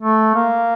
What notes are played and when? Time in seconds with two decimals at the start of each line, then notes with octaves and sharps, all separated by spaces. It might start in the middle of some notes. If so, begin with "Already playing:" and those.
0.01 A3
0.35 A#3